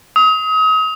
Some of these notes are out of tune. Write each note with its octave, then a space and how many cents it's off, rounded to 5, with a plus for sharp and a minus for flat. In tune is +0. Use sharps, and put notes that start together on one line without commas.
D#6 +35